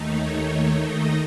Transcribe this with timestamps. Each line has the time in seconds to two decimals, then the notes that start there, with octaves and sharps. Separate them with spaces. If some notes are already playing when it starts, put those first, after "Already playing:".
Already playing: D#2 D#3 A3 D#4
0.10 C#5
0.44 C#5
0.80 D#5